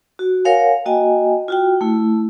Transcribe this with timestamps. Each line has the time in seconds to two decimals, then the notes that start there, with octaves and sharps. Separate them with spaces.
0.19 F#4
0.45 A#4 C#5 F5 F#5 G#5
0.86 A#3 F#4 D#5 G5 G#5
1.48 F4 F#4 G5
1.81 A3 E4